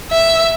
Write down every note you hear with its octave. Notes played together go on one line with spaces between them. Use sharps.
E5